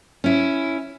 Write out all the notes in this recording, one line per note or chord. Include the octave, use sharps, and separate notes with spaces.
C#4 E4